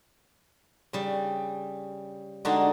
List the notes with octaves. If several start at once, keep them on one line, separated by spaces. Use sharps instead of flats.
C#3 G3
D3 G#3 D4 D#4 F#4